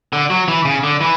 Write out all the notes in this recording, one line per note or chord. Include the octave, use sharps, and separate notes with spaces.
D3
F#3
E3
C#3
D3
E3